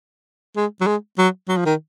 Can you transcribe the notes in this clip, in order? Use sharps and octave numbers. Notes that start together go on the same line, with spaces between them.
G#3
F#3
G#3
F#3
F#3
F3
D#3